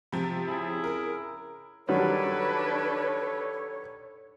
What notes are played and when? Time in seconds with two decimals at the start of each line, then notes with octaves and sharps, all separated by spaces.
0.12 C3 F3
0.48 C#3 E4 G#4
0.84 A#4
1.89 D#3 F#3 G3 D4 A4 B4 C#5